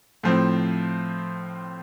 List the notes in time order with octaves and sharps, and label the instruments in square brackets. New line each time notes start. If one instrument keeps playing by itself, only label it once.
[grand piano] A2 F3 C4